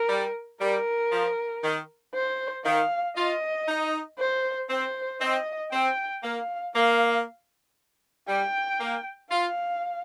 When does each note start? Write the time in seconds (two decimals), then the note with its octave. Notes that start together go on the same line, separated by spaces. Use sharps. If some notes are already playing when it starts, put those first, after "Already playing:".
Already playing: A#4
0.09 G3
0.61 G3 A#4
1.12 F3
1.64 D#3
2.14 C5
2.65 D#3 F5
3.17 F4 D#5
3.68 D#4
4.19 C5
4.70 C4 C5
5.21 C4 D#5
5.72 C4 G5
6.23 A#3 F5
6.75 A#3 F5
8.28 G3 G5
8.80 A#3
9.31 F4 F5